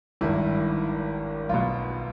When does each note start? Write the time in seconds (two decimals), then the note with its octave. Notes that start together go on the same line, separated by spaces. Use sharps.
0.21 G#1 G2 D#3 E4
1.49 B1 B2 F4